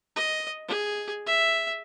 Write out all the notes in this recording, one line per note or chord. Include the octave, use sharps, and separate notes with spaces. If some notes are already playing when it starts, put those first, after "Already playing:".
D#5
G#4
E5